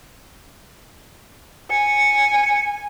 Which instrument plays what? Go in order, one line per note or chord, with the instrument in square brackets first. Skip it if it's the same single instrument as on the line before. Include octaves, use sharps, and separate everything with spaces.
[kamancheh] G#5 [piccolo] C#7